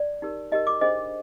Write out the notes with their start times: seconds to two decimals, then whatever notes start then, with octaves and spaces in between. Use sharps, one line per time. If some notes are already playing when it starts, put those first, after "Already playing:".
Already playing: D5
0.22 D#4 G4 A#4
0.52 D#4 G4 A#4 D#5
0.67 D6
0.81 D4 G#4 C5 D#5